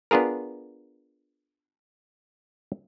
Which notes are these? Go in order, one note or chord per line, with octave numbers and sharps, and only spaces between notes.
B3 D4 F4 G#4 A#4